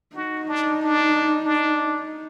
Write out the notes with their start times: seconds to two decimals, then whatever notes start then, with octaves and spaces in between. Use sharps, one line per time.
0.15 D#4 F#4
0.48 D4
0.81 D4
1.46 D4